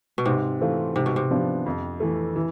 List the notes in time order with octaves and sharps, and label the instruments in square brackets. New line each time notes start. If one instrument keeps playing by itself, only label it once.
[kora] B2
[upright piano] G#2 [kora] C3
[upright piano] E3 A3 C4 F4
[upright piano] G#2 [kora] C3
[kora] B2
C3
[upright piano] F3 B3 D4
F2
E3 A3
E3